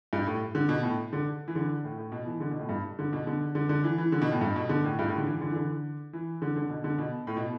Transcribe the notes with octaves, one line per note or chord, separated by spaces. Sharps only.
G2
A2
D3
B2
A2
D3
E3
D3
A2
A2
B2
E3
D3
B2
A2
G2
D3
B2
D3
D3
D3
E3
E3
D3
B2
A2
G2
B2
D3
A2
G2
A2
D3
E3
D3
E3
D3
E3
D3
D3
B2
D3
B2
A2
B2